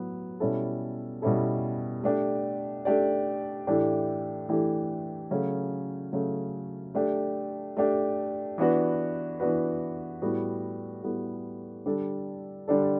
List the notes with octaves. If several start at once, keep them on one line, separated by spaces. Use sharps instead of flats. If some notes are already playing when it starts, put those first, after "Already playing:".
Already playing: A2 F#3 B3
B2 G3 C#4 E4 A4
B2 G3 C#4 E4 A4
A3 D4 G4 D5
A3 D4 G4 D5
A2 E3 A3 D4 G4
A2 E3 A3 D4 G4
C#3 F#3 A3 C#4
C#3 F#3 A3 C#4
A3 D4 G4
A3 D4 G4
E3 B3 D4 F#4 B4
E3 B3 D4 F#4 B4
A2 G3 B3 F#4 A4
A2 G3 B3 F#4 A4
D3 G3 D4 A4
D3 G3 D4 A4